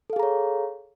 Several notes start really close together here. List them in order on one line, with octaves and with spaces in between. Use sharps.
A4 F5 G#4 A#5 C#5